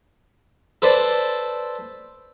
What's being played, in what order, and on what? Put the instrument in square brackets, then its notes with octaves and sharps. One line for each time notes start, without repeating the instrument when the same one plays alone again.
[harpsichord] A4 B4 C5 D5